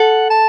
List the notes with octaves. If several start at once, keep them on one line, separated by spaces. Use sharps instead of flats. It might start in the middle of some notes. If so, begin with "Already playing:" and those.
Already playing: A4 F#5
A5